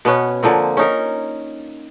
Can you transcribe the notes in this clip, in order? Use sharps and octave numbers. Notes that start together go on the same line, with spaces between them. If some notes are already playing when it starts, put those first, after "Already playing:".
B2 B3 C#4
D3 F3 A#3 C4
C#4 D#4 A#4